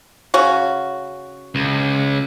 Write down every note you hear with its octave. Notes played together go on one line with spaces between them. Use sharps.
C#3 C#4 F#4
C#2